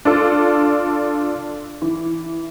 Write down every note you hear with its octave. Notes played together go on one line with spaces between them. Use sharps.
D4 F4 A4
E3